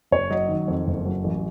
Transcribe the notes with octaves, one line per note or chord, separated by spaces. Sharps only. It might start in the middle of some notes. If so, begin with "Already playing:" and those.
F#1 C#5
F#3 D#5
D#3
F2
F#1
F#3
A1